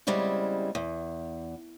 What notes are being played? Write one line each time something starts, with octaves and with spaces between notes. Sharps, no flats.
E2 C#3 G3 G#3 C4 E4
E2